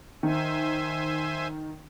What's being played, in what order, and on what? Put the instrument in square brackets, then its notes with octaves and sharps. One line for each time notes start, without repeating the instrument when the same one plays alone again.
[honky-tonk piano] D#3 [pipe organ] C5 E5 G#5